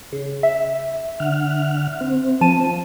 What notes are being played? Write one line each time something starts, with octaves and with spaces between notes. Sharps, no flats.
C#3
E5
D3 F#5 F6
C4
F3 A5 D#7